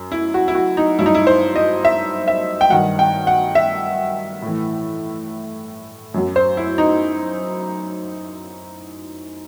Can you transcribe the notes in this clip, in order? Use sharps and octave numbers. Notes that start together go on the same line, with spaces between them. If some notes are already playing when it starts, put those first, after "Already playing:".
Already playing: F#2
E4
F#4
E4
F#4
D#4
G2 F#3 E4
D#4
E4
C5
D#5
E5
E5
G5
G2 D#3 F#3 F#5
G5
F#5
E5
A2 E3
F#2 F#3
C5
E4
D#4